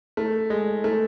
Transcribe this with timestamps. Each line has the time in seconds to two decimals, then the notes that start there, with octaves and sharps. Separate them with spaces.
0.17 A3
0.50 G#3
0.84 A3